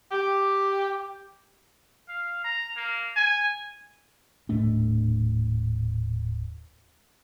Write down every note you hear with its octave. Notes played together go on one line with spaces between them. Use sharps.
G4
F5
A#5
A#3
G#5
D#1 A2 A3 D4